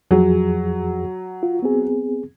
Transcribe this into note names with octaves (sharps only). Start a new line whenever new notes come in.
F2 F3 F#3 G#4
F4
B3 C4 G#4